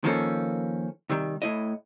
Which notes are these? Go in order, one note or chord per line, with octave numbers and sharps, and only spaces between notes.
D#3 F3 A#3 C#4 A4
C3 D#3 G3
A2 E4 D#5